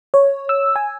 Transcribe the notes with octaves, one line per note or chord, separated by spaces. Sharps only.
C#5
E6
G#5